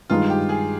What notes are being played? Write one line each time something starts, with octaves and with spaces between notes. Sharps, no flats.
G2 D#3 G#3 D#4 F4
G4
G#4